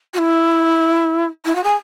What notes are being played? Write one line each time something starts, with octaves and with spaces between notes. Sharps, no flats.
F#4
E4
E4
F#4
G#4